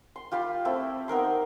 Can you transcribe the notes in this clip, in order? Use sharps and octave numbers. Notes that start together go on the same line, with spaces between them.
C6
F4 G4 F5 B5
A3 C4 E4
B3 D#4 A#4 C6